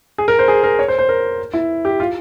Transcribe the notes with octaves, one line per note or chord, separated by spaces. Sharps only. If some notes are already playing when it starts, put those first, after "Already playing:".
G#4
A#4
C5
G#4
A#4
C#5
C5
C5
A#4
E4
G4
F4